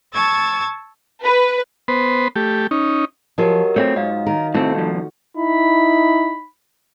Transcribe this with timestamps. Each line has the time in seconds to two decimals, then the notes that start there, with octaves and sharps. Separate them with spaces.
0.14 A5 C#6 E6 G#6 A6
1.23 B4
1.88 B3 B4 C5
2.36 A3 G4
2.71 C#4 D#4
3.38 F3 F#3 F4 G4 A#4 D#5 G#5
3.76 A3 A#3 C4 C#5
3.96 G#2 D#5 F5
4.27 D#3 A#4
4.55 A2 C3 A3 C4 F#4
4.74 C2 F2 F3
5.37 D#4 E4 B5